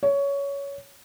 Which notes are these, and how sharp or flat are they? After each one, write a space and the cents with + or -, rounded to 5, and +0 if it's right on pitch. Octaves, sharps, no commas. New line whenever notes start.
C#5 +15